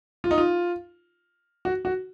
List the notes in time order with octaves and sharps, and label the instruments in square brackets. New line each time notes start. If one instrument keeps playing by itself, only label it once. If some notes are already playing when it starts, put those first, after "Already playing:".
[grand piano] F4
D#4
F4
F#4
F#4